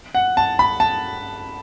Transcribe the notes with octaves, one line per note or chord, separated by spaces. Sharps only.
F#5
A5
B5
A5